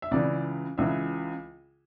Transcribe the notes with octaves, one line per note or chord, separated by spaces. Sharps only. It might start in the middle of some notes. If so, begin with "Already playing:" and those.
E5
C#2 C#3 E3 D5
C#2 C#3 E3 E5